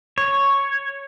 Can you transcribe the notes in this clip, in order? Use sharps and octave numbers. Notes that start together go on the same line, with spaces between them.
C#5